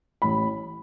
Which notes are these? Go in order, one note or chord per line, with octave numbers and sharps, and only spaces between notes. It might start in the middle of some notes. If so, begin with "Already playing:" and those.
A1 B5